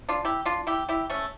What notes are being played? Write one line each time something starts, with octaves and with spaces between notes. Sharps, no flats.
D4 F4
E4 G4
D4 F4
E4 G4
E4 G4
A3 C#4